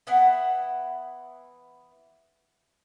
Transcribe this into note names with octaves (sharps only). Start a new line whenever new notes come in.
E3 B3 E4 F#5